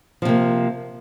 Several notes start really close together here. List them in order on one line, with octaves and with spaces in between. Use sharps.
F3 C3 A#3